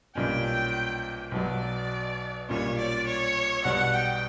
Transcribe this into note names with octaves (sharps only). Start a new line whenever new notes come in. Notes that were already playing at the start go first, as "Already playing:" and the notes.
B1 A#2 G3 C#4 G5
B1 B2 F#3 D5
B1 A#2 G3 C#4 C#5
D5
C#5
B1 B2 G3 F#5
G5